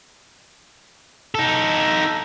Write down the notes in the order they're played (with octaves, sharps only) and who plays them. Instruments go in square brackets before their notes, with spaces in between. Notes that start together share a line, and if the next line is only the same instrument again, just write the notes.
[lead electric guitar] D#4 A4